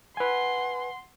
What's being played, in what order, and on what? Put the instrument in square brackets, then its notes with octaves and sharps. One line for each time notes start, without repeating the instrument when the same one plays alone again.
[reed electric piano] B4 G#5 [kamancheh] F#5 C6